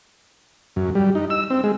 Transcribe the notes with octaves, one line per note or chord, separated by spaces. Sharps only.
F#2
G3
D#4
E6
C4
G#3